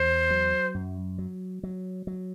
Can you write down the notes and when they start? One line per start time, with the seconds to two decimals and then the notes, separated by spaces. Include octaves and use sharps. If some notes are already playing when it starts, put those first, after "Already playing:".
Already playing: E2 C5
0.31 F#3
0.75 F#2
1.18 F#3
1.63 F#3
2.07 F#3